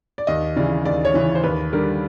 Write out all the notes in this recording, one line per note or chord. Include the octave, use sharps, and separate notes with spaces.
D5
D#2 D#5
C#3 E3 D5
D#2 D5
C#5
C#3 E3
C5
D#2 B4
D3 G3 A#4